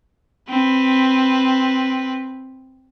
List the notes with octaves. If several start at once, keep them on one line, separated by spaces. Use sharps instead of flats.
C4 B4